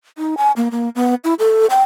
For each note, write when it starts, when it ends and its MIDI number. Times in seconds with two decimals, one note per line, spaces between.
0.18 0.35 63
0.37 0.51 80
0.56 0.68 58
0.72 0.90 58
0.95 1.15 59
1.24 1.34 64
1.39 1.66 69
1.70 1.82 79